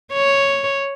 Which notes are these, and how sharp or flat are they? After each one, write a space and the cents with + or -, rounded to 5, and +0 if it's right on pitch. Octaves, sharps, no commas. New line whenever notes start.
C#5 +0